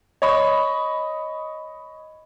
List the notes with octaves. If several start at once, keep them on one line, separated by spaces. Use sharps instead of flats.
C#5 D#5 B5